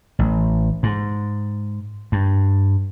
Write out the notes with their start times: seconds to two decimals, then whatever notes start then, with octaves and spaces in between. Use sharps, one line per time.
0.19 A1
0.83 G#2
2.12 G2